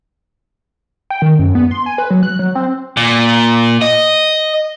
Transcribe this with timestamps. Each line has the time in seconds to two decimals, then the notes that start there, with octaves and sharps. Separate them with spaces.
1.10 G5
1.22 D#3
1.39 F#2
1.55 B3
1.71 C6
1.86 G#5
1.98 B4
2.10 F#3
2.23 F#6
2.39 F#3
2.55 C4
2.97 A#2
3.82 D#5